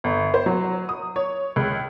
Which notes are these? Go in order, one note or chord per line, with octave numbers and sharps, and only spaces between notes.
G1
C5
F#3
D#6
C#5
C#2